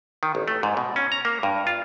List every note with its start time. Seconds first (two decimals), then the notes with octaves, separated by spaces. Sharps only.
0.23 D#3
0.35 A1
0.48 A3
0.63 G#2
0.77 B2
0.96 C#4
1.12 A#5
1.25 A#3
1.43 G2
1.67 F4